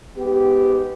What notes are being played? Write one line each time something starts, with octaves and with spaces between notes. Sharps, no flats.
G#2 B3 G4